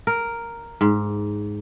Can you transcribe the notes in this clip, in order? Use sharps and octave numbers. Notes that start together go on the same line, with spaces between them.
A#4
G#2